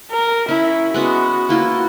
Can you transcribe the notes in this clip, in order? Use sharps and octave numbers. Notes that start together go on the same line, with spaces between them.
A#4
C#4 E4
G#3 B3 C#4 F#4
A#3 E4 F4